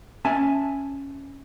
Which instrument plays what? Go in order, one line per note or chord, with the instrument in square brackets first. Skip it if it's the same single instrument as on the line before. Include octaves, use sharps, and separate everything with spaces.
[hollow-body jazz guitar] C#4 E5 G#5 A5